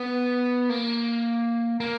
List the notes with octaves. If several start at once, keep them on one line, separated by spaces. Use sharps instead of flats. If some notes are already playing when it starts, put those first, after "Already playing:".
Already playing: B3
A#3
A#3